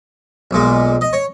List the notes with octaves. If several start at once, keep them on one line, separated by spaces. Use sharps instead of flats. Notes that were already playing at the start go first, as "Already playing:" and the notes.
B1 A#2 G#3
D#5
C#5